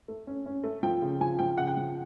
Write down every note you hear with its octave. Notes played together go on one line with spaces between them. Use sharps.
A3
C#4
C#4
A3
F3 G5
C#3
F3 G#5
F3 G5
C#3 F#5
G5
F3